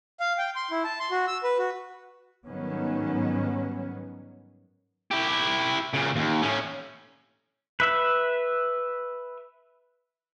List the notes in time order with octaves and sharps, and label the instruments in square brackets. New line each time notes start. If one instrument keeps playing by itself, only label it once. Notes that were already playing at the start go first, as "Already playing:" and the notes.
[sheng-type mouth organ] F5
G5
C6
E4
A5
C6
F#4
E6
B4
F#4
[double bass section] G#2 D#3 F#3 G3 B3 C#4
[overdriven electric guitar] E4 G4
A#2 C#3
D#2
A2 C#4
[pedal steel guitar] B4 E5